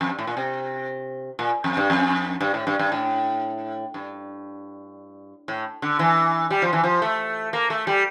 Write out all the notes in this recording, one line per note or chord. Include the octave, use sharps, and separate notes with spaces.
F2
G2
A2
A#2
C3
A#2
F2
G2
F2
G2
A2
G2
G2
A2
G2
A2
D3
E3
G3
F3
E3
F3
A3
A#3
A3
G3